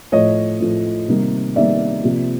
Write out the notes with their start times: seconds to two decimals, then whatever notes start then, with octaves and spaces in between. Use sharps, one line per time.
0.12 A2 F3 A3 C#5 D#5
0.60 A2 F3 A3
1.08 C3 D#3 G3 A#3
1.56 C3 D#3 G3 A#3 D5 E5
2.04 C3 F3 A#3